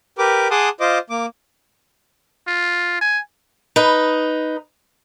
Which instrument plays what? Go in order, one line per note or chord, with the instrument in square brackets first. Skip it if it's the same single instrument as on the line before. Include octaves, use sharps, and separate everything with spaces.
[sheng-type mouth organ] G4 A#4 B4 D6
G#4 F#5 A5 C6 D6 D#6
F4 C5 D#5 D6
A#3 D6
[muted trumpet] F4
G#5
[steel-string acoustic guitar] D#4 B4